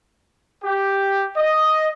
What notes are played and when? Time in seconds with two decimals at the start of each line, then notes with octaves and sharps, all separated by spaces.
0.64 G4
1.37 D#5